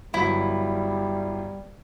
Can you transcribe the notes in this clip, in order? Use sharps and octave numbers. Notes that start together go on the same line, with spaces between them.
G1 F#3 G3 E4